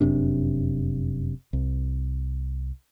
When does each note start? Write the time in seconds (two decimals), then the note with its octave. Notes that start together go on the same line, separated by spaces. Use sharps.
0.01 F1 F#2 C3 D4
1.53 C2